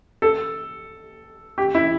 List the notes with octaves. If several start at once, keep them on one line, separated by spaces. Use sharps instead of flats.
A4
G4
E4